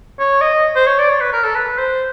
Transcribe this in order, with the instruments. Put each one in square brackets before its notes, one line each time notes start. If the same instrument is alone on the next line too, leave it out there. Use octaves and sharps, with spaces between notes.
[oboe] C#5
D#5
C5
C#5
D5
C#5
B4
A#4
A4
B4
C5